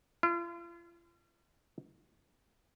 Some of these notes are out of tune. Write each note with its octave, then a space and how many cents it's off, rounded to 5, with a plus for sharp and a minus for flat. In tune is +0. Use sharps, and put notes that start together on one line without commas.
F4 -40